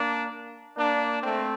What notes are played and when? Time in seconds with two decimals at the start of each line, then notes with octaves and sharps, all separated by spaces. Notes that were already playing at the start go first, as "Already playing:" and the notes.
Already playing: A#3 D4
0.77 A#3 D4
1.23 A3 C4